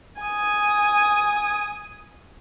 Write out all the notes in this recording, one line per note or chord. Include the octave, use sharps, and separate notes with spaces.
G#5 D#6